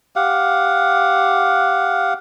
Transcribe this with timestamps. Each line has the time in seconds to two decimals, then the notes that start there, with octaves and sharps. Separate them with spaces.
0.16 G4 F5 F#5